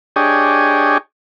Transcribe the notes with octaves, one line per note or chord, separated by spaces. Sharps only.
D4 G4 G#4 C#5 D#5